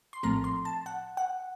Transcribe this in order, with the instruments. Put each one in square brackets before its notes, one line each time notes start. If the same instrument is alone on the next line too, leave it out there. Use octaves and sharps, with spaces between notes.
[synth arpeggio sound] C6
A#1 A2 F3 A3 C4 A#5
C6
A5
F#5
F#5